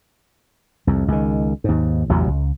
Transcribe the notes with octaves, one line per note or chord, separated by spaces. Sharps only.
C2 F2
C#2 D#3
D#2 G#2
A1 E2 C3 F#3
C#2